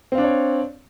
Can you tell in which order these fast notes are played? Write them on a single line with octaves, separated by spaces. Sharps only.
C4 F5 D4 D5 C#5